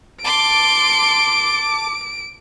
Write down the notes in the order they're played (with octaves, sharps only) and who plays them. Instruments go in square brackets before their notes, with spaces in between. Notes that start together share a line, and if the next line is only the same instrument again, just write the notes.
[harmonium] A5 [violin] C6 [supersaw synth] D6 [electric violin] D7